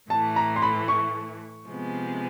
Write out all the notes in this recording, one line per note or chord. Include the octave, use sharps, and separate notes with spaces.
A2 E3 A3 A5
A#5
C6
B5
C#6
C3 F3 G#3 B3